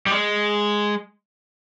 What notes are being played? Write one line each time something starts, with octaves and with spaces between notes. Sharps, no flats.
G3
G#3